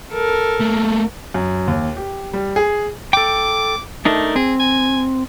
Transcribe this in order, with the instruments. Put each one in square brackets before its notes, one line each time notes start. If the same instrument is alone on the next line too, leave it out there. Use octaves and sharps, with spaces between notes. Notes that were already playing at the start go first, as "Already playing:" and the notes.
[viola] A4 A#4
[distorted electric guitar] A3 A#3
[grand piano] F#2
D#2
G4
G3
G#4
[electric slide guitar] A4 G5 [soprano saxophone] D6
[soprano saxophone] A3 [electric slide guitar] D4 D#4 A#4
[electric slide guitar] C4 [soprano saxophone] G#4
[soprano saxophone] G#5